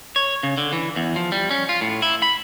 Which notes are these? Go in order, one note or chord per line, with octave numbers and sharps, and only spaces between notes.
C#5
C#3
D3
E3
E2
F3
G3
C#4
F4
A2
E4
B5